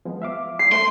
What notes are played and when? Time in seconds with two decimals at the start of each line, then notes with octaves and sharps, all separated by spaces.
0.05 F3 G#3 B3
0.22 E5 F5 D6
0.59 C7
0.72 A3 C5 C6